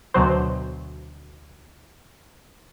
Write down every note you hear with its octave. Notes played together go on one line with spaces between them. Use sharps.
D2 B2 F#3 C5